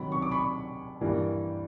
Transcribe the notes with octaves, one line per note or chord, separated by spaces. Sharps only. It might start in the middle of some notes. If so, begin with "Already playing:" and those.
Already playing: C3 D#3 F#3 B5
C#6
D6
B5 C#6
G2 E3 G3 A#3